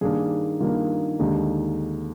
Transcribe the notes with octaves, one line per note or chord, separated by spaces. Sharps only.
G2 D#3 A#3 D4 G#4
G2 D#3 A#3 D4 F4
D#2 D3 G#3 D4 D#4